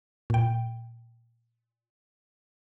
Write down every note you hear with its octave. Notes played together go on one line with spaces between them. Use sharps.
A#2 G5